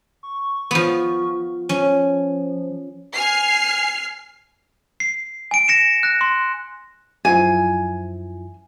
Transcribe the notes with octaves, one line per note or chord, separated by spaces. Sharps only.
C#6
F3 B3
F3 C#4
G#5 F6 C7
C7
G#5 D7
A#6 C#7 E7
F#6 A#6
C6
F#2 F3 E4 G#5